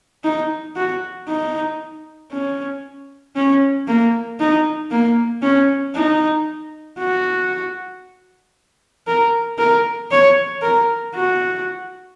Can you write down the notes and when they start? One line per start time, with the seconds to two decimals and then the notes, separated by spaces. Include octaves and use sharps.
0.24 D#4
0.76 F#4
1.28 D#4
2.32 C#4
3.36 C#4
3.88 A#3
4.40 D#4
4.91 A#3
5.43 C#4
5.95 D#4
6.99 F#4
9.07 A#4
9.58 A#4
10.11 C#5
10.62 A#4
11.15 F#4